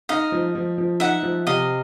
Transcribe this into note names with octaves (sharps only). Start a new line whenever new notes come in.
D#4 D#5 F5
F3
F3
F3
D#4 E5 F#5
F3
C3 D#5 F5